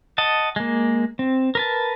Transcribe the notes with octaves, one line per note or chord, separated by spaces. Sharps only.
D#5 F#5 A5
G#3 A#3
C4
A#4 B4 A5